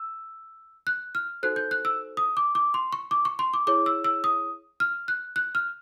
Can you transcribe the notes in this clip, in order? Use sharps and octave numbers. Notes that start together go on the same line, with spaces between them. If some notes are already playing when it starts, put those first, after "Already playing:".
Already playing: E6
F#6
F6
D#4 F#4 A4 C5 F#6
G6
F#6
E6
D#6
D6
D6
C6
C#6
D6
C#6
C6
D6
E4 G#4 C#5 D6
E6
E6
D#6
F6
F#6
F#6
F6